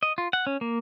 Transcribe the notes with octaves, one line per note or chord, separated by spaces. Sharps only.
D#5
F4
F#5
C#4
A#3